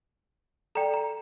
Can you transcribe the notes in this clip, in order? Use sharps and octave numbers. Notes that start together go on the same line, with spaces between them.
A4 D5 G5 A#5
A#5